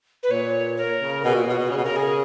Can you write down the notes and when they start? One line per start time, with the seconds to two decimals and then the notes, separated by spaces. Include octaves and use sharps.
0.23 B4
0.31 A#2 C#5
0.77 A#4
1.01 C#3
1.24 B2 G#4
1.33 A#2 F#4
1.47 B2
1.50 F#4
1.59 B2
1.70 C#3 G#4
1.77 B2
1.84 C#3 A#4
1.96 G#4